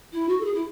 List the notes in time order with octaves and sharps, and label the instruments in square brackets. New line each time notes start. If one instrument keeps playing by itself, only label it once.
[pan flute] E4
F#4
A4
G#4
E4